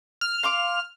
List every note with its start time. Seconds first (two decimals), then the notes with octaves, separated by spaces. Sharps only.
0.21 F6
0.43 F5 C6 D6